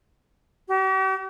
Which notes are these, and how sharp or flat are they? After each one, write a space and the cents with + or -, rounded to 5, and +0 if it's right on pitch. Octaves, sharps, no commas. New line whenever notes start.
G4 -45